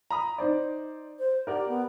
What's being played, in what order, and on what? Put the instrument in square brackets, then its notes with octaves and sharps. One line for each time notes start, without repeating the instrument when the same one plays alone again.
[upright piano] A#5 B5 D#6
D#4 C5 D5
[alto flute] C5
[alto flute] G4 [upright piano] A#4 D5 F#5
[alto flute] B3